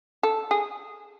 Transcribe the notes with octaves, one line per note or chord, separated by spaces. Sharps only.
A4
G#4